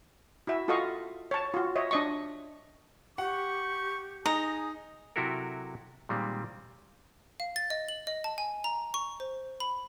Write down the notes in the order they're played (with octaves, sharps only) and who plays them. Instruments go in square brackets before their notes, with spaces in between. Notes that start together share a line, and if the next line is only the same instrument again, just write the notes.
[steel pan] E4 F#4 E5
F4 F#4 A4 D#5 F5 C#6
C#5 A5
F4 F#4
C#5 D#5 E5
D4 D#5 C#6
[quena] G4 [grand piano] F#5 [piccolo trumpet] C#6
[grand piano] D#4 [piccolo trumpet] G#4 [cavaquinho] A#5
[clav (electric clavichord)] C3 F#3 E4 F#4 A4 A#4
A#2 D#3 G3 G#3 C4
[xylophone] F5
A6
D#5
F#7
D#5
A5
G#5
A#5
C#6
C5
B5